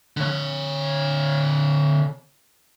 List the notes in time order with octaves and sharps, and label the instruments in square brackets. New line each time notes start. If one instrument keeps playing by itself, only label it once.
[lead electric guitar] D3 C#5